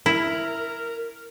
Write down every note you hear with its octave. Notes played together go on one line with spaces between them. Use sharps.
E4 A#4